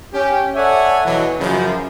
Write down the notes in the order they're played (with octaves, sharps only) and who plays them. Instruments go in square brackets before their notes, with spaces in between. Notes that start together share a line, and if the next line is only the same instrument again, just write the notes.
[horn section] C#4 G4
A4 C#5 D5 E5 F#5 G#5
B2 E3 F#3
F#2 C#3 F3